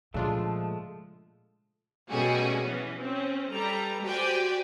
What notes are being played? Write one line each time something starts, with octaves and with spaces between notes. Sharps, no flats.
A#2 C#3 F3 G#3 A3 D4 F4
B2 G3 A3 C#4 F#4 G#4
E3 B3 C#4
C4 C#4
G3 A4 B4 A#5
F#4 G4 C5 D5 G5 G#5